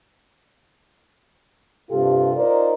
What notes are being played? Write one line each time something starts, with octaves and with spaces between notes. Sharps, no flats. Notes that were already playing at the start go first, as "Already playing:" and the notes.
G2 C3 F4 G4 A4
D#4 F4 A#4 C5 D5